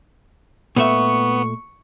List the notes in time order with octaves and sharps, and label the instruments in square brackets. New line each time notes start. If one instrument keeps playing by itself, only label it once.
[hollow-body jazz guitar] A#2 A3 E5 [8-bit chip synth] B3 [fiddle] C#6